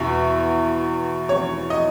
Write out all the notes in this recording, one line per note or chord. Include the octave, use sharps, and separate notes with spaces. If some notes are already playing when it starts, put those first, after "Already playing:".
Already playing: E2 B2 E5
C#5
D#5